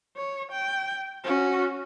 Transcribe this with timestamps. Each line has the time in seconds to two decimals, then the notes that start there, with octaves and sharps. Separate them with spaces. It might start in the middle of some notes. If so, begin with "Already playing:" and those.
0.17 C#5
0.51 G5
1.24 C#4 F#4